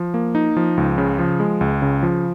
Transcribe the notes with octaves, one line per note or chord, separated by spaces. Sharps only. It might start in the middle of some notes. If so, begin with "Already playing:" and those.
Already playing: F3
A#3
D#4
F3
C#2
C#3
F3
G#3
C#2
C#3
F3